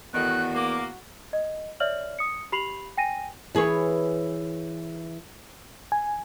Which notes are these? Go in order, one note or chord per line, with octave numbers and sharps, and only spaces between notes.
E2 A2 D#3 F#4 F#6
A#3 D6
D#5
C#5 D5 E5 F6 F#7
D#6 C#7
G4 B5 C7 F7 F#7
G5 G#5 A#6 D#7
E3 G#4 B4 C#5
G#5